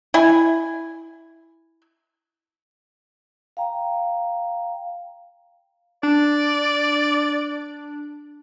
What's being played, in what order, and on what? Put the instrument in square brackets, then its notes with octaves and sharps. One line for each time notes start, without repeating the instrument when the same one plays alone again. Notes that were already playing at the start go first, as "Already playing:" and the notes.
[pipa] E4 G#5
[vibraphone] F5 G5 A#5
[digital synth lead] D4 [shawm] D5